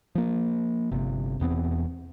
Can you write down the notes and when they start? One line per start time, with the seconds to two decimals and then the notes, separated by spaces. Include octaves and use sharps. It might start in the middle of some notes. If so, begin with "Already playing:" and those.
0.15 F3 A#3
0.92 G1 C3
1.40 E1 E2 B3 C4